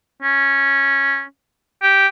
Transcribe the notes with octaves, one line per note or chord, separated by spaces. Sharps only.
C#4
G4